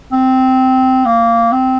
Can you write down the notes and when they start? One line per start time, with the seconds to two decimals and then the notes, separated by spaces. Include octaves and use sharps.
0.12 C4
1.05 A#3
1.52 C4